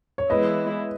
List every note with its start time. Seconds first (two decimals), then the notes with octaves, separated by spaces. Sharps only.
0.18 C#5
0.30 E3 G#3 B3 E4 B4 D#5